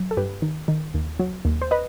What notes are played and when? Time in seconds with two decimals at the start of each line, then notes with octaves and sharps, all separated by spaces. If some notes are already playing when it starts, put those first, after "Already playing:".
Already playing: F#3
0.11 A4
0.17 G2 G4 B4
0.42 D#3
0.68 D#3
0.94 D#2
1.19 F#3
1.45 D#2
1.62 C5
1.71 B4 D#5